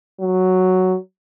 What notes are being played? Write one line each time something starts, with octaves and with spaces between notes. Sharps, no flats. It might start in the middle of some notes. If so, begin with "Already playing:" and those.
F#3